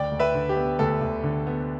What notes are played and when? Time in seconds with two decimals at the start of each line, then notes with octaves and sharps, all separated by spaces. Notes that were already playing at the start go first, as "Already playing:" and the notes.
Already playing: D2 D5 G5
0.12 D2
0.20 B4 E5
0.35 D3
0.49 G4
0.57 B3
0.79 D2 A4
1.01 D2
1.24 D3
1.47 B3